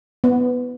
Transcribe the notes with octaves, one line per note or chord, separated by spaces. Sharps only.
B3